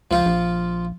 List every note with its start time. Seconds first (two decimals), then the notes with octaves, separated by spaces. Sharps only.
0.11 C#2 F3 F4
0.26 A#1